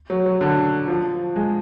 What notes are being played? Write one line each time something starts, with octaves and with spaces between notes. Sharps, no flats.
F#3
F#3
D3
F3
G#3